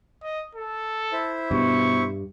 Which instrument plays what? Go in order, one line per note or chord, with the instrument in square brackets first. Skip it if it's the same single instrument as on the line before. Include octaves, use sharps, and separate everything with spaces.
[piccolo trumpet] D#5
A4
[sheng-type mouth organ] E4 C5 E5
[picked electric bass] G2 [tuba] B2 [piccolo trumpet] C#6